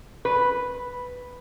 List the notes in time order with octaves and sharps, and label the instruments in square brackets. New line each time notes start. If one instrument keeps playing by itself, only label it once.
[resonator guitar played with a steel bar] B4